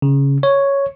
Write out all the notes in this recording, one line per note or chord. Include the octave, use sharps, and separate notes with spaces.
C#3
C#5